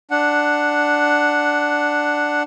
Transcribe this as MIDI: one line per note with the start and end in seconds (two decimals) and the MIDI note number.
0.11 2.43 62
0.11 2.43 78